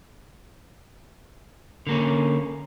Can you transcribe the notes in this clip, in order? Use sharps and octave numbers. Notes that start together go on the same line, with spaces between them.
D3 A#3 C#4